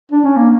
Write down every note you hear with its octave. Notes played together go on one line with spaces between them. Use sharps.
D4
C#4
A#3